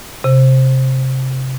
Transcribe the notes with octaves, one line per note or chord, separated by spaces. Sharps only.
C3